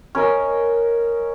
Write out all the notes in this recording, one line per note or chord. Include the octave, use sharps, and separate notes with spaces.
C#4 A#4 D#5